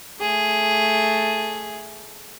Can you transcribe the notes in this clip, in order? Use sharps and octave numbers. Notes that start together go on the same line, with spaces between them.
A3 G#4